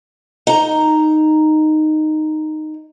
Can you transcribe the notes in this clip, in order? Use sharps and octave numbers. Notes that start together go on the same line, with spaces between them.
D#4 A#5